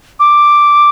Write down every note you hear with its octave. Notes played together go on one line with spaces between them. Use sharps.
D6